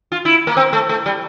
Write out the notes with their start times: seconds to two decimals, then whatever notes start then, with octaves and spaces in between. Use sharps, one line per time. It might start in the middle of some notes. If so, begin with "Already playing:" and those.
0.12 F4
0.25 E4
0.47 A#3
0.57 C4
0.73 A3
0.89 A3
1.06 G3